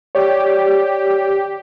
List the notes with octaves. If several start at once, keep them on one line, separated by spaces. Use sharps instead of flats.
G4 C#5 D5